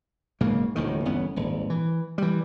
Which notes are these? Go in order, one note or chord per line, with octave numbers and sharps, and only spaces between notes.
B1 G#2 C#3 A#3
D#1 D2 A2 D#3
G1 E2 B3 C#4
D#1 G#1
E3
E3 G3